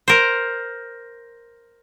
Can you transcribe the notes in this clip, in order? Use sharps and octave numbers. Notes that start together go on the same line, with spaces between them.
A#4 C5